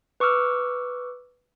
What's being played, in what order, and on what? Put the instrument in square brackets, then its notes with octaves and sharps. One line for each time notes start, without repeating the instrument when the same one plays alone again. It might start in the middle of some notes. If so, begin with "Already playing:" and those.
[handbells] B4 C#6 D6 E6 F6